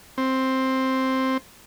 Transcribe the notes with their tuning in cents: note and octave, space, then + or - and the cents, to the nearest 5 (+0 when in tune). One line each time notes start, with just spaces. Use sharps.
C4 +5